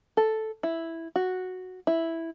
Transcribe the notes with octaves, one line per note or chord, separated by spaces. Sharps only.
A4
E4
F#4
E4